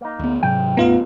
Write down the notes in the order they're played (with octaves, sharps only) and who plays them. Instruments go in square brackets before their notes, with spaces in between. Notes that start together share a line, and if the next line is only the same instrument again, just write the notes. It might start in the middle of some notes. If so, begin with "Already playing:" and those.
[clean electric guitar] A#3 D#4
[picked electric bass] D2 B3
[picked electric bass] G#2 C3 F#3 [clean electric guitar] G5
[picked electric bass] A1 E2 A2 [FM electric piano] B3 F4 F5 [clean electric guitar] D#4